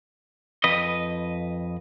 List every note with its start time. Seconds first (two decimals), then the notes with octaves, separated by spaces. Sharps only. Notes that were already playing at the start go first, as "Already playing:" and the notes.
0.64 F2 B4 D#5